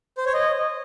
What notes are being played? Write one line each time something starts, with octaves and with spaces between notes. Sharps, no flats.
C5
C#5
D#5